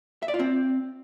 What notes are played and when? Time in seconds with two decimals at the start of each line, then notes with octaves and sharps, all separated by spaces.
0.23 E5
0.28 D5
0.34 F4
0.40 C4